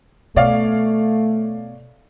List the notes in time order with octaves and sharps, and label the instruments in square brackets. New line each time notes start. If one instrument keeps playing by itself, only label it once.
[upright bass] B2 [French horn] A3 [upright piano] C#5 D5 F5